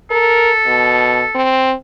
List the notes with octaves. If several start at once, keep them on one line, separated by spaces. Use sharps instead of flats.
A4 A#4
B2
C4